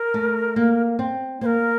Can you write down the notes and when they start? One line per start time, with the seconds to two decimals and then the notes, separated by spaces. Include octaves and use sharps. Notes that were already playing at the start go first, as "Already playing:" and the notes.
Already playing: A#4
0.14 A3
0.56 A#3
0.99 C4
1.41 A#3 C5
1.46 A#4